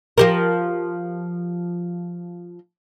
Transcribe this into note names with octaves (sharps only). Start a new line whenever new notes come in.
F3 G4 A#4